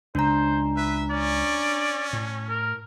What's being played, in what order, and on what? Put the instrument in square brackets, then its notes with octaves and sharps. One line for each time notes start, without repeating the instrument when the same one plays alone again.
[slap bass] C#2 [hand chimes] D4 A#5 [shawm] C5
[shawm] B4 [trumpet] E5
[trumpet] C#4 [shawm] D5
[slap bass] A2
[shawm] A#4